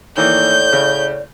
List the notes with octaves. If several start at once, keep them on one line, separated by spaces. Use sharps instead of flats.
A2 D#3 E3 A#3 D5 G6
C#3